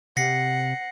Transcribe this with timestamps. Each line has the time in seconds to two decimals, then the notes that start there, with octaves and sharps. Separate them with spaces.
0.17 C3 F#5 A#6 C7 C#7